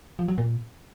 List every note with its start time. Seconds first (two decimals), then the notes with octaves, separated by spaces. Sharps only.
0.19 F3
0.28 F#3
0.38 A#2